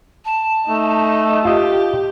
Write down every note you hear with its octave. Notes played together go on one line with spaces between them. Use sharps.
A5
A3 D#4
F4 G4 D#5